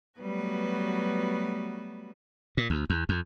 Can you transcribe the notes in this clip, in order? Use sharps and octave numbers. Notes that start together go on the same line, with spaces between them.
F#3 G3 A3 B3 F#4 B4
A#2
D2
E2
F2